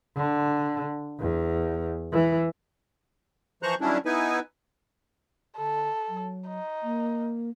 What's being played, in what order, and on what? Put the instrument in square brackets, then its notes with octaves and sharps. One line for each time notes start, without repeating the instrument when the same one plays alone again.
[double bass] D3
E2
E3
[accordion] E3 F3 C5 A#5 C#6 F#6
D#3 F#3 G3 C#4 D4 E4
B3 D#4 E4 B4 G#5
[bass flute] D3 [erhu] A4
[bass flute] F#3
[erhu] D#4
[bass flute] A#3